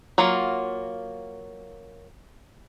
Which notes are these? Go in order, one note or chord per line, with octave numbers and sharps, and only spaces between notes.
F#3 A#3 F4